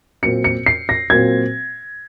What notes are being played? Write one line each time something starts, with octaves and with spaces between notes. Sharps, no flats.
A#2 F#3 C4 C#7
C#7
C7
A#6
A#2 F#3 C4 G#6